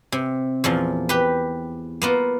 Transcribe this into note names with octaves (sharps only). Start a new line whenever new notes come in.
C3
E2 A#2 F3
G4 B4
A#3 B3 F4